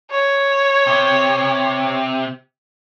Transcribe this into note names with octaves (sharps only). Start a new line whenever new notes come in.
C#5
C3